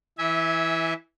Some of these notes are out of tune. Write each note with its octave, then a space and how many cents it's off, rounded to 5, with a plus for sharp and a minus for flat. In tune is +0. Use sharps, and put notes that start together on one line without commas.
E3 +0 E5 -25 G#5 +0